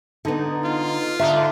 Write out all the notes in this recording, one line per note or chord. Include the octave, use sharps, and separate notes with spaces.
D3 B3 D#4
F4
D3 D4 D#4 E5